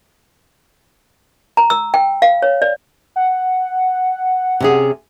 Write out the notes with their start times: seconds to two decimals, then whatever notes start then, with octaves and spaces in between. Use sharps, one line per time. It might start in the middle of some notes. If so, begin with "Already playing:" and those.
1.57 A#5
1.70 E6
1.94 G5
2.22 F5
2.42 C#5
2.62 D5
3.16 F#5
4.60 C3 C#4 G#4